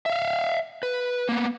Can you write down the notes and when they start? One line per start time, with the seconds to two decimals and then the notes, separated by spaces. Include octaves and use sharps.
0.06 E5 F5
0.83 B4
1.29 A#3 B3